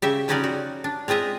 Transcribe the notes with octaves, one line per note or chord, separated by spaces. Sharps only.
C#3 G4 E5
F3 G3 C#4 D#4 F#4 D5
F#4
D4
G#3 C4 F4 D#5 E5